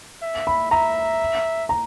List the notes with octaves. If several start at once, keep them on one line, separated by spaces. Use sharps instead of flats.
E5
B5
E5 A#5
A#5